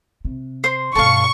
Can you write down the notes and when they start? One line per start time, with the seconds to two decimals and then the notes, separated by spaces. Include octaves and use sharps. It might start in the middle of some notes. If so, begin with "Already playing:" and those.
0.25 C3
0.64 C5 C6
0.95 G2 B2 A4 F5 C#6